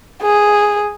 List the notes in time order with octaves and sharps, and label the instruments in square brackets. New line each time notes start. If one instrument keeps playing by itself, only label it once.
[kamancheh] G#4